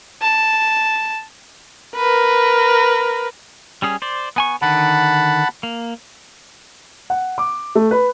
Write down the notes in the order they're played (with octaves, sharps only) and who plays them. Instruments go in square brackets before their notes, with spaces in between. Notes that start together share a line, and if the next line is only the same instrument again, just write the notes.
[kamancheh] A5
A#4 B4
[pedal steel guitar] G3 C#4 G#4
C5 D5
B3 G#5 C#6
[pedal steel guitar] D3 D#3 [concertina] F#5 A5 B5
[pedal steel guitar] A#3
[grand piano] F#5
D6
A3
B4